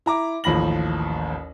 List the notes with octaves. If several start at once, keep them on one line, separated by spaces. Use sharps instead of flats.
E4 A#5 D6
A1 D#2 F3 B5 A#6 F#7